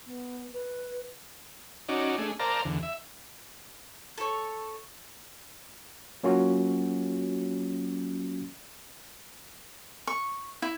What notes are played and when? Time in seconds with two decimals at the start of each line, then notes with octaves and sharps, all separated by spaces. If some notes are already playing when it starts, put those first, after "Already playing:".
0.05 B3
0.53 B4
1.89 C#4 D#4 F#4 D5
2.18 A3 D4 G#4
2.39 A#4 C5 D5 F5 A5 A#5
2.65 E2 D3
2.83 E5
4.18 A4 C#5
6.23 F#3 A#3 C#4 F4 F#4
10.07 C#6
10.62 E4